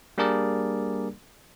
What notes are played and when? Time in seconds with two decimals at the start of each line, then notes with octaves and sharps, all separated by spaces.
0.18 G3 A#3 D4 G#4 A#4 D5